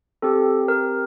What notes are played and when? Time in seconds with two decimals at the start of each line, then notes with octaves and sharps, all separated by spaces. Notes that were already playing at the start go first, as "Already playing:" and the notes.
0.22 C4 G4 A4
0.68 A#4